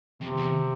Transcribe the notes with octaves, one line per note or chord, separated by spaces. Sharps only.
F2 C3
E2